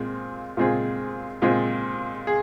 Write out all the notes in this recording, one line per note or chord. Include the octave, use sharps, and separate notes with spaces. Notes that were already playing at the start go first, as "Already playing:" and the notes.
Already playing: A#2 G#3 C4 F4 G#4
A#2 G#3 C4 F4 G#4
A#2 G#3 C4 F4 G#4
G#4